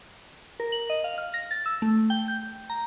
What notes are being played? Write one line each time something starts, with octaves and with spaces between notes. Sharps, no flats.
A#4
F#7
D#5
F5
F6
A#6
A6
E6
A3
G5
G6
A#5